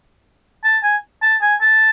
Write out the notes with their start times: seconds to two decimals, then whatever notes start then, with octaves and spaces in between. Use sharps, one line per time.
0.64 A5
0.83 G#5
1.22 A5
1.42 G#5
1.61 A5